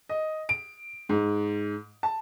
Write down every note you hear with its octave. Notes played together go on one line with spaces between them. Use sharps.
D#5
D7
G#2
A5